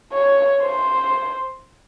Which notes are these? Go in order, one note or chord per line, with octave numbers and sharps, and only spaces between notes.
C#5
C5